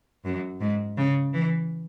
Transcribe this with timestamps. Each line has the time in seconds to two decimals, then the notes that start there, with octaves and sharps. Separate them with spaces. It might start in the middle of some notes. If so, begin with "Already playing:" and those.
0.25 F#2
0.61 G#2
0.97 C#3
1.33 E3